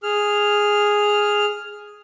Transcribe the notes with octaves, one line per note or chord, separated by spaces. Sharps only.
G#4 F6